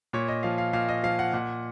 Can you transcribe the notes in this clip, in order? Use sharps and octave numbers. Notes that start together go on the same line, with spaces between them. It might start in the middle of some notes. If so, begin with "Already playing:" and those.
A#2 C#5
D#5
F3 F5
F5
A#2 F5
D#5
F3 F5
F#5
A#2 F#5